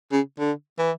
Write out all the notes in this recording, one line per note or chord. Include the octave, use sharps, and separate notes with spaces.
C#3
D3
E3